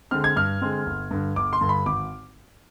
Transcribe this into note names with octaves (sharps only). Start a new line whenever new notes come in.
D3 G#3 C4 F6
G#6
G2 F6
D3 G#3 C4
G1
G2 D3
G1 D6
C6
G2 D3
B5
G#1 D6